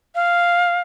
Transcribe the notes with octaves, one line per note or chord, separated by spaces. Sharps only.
F5